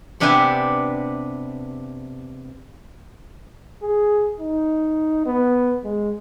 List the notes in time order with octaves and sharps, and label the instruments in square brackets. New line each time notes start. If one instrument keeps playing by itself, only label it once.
[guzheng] C3 B3 D4 G4 E5 G#5
[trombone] G#4
D#4
B3
G#3